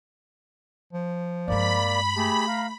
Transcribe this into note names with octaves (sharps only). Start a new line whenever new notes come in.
F3
G2 G#3 A#3 D5 B5
A3 G4 G#4 A5
F5 A#5